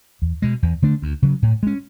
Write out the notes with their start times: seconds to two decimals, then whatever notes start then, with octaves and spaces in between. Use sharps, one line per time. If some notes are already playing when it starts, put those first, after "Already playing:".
0.22 E2
0.42 B2 G#3
0.63 E2
0.82 D3 A3 D4
1.02 D2
1.22 C#3 F#3
1.42 A2
1.63 G#3 C#4